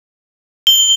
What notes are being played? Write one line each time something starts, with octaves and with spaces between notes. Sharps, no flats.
G7